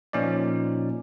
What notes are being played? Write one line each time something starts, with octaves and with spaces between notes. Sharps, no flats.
A#2 F3 C#4 D#4 D5